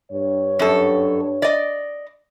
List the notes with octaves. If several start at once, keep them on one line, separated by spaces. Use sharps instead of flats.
G2 C#5
F#2 A4
D5 D#5